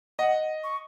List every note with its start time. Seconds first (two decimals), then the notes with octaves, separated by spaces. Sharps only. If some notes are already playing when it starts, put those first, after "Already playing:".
0.19 D#5 F#5
0.63 C#6